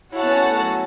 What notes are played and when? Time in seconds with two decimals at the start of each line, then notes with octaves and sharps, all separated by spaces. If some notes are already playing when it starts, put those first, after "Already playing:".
0.12 E4 F#4 C#5 F#5 A5
0.23 B3
0.27 C#4
0.43 A3
0.58 F#3